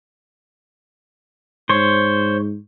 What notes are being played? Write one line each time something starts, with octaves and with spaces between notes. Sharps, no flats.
G#2 C5 C#5